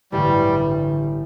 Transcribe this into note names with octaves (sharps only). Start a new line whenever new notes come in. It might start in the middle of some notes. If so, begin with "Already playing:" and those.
A1 G2 D3 G3